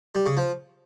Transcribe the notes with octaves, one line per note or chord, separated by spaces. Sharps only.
G3
C#3
F3